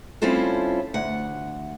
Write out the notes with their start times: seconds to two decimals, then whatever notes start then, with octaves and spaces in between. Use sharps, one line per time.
0.22 G3 C4 C#4 E4 F4 A4
0.94 D2 F#5